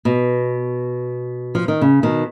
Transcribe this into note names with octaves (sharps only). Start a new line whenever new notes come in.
B2
F3
D#3
C#3
B2 D#3